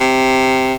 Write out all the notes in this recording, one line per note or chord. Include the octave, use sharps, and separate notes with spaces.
C3